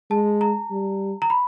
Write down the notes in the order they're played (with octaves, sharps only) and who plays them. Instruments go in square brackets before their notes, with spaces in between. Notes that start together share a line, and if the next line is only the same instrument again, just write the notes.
[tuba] G#3 [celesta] A5
[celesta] A#5
[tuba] G3
[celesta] A#5
B5